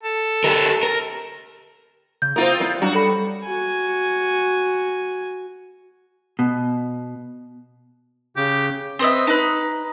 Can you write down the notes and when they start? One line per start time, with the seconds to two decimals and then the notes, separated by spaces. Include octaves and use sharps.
0.04 A4
0.44 G4 A#4
0.83 A#4
2.22 C#3 G6
2.36 A#3 C4 E4 F4 A#4 C5 D#6
2.60 G3 B3 E4
2.82 F#3 G3 D4 F#4 A#5
2.95 A4 B5
3.45 F#4 G#5
6.39 B2
8.36 C#3 G4
8.99 C4 B4 D#5 E5
9.27 D#4 B4